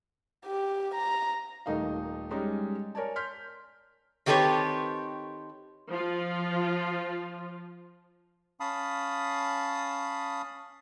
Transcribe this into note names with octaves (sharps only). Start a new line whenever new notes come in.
G4
A#5
D#1 D#3 A3 D#4 D#5 F5
G3 G#3 C#4 D#4
A#4 C#5 D5 G#5 A5
C6 F6 G6 B6
D#3 C4 G4 A4 B4 C#5
F3 F4
C#4 F5 A5 B5 D#6